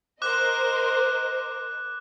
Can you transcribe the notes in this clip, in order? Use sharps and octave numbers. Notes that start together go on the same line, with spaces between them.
A#4 C5 D#5 D6 F#6